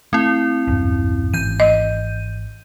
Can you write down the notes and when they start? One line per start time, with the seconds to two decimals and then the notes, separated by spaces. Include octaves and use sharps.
0.13 A3 C4 E4
0.67 B1 E2 G2
1.34 G#1 C#2 E3 G6 D#7
1.60 D#5